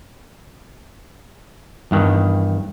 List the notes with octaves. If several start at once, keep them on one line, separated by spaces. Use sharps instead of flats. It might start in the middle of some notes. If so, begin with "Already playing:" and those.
E2 G2 D#3